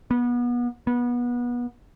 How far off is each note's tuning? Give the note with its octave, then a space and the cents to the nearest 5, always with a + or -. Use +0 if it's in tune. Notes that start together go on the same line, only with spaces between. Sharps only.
B3 -30
B3 -25